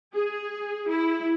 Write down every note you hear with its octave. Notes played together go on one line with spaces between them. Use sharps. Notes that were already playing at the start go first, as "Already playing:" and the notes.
G#4
E4